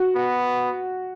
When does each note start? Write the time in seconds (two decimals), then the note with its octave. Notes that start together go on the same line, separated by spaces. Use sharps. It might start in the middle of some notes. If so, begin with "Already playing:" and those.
Already playing: F#4
0.16 B3